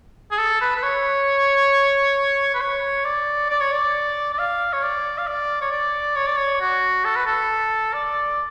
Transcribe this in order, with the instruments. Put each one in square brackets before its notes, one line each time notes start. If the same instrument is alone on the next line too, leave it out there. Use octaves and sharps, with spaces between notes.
[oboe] G#4
A4
B4
B4
C#5
B4
C#5
D5
D5
C#5
D5
D5
F5
C#5
D5
F5
D5
C#5
D5
C#5
D5
C#5
F#4
A4
B4
A4
D5